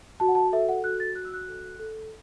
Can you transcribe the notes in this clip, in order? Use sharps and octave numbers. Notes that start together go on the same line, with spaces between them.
F#4 A5
F#5
A5
A4 E5
F#5
F#4 F#6
A6
F#4 F#6
E6
F#6
A4
A4